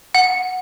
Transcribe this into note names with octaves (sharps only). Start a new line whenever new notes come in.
F#5